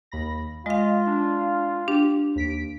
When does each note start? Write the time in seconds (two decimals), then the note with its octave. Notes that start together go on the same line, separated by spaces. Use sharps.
0.12 D#2 B5 A#6
0.66 G#3 F4 D#5 F5
1.07 D4
1.88 D4 G4
2.36 D#2 B6 D7